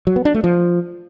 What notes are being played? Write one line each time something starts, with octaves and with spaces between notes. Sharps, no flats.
F#3
B3
D4
A3
F3